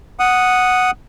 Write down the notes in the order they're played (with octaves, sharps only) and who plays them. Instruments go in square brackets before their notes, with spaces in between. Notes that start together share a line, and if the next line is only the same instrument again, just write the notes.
[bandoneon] F#5 D#6